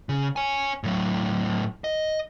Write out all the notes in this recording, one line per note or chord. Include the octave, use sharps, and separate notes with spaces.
C#3
C#5 G#5
A2 F#3
D#5